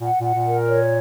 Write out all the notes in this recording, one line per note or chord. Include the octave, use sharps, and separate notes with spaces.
A#2 F#5
A#2 F#5
A#2
A#4
C#5